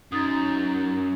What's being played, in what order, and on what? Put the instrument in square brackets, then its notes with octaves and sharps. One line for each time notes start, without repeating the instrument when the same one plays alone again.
[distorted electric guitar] F#2 [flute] D#4 [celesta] D#6 A6